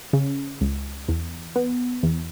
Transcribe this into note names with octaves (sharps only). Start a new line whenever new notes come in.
C#3
C#2
E2
B3
E2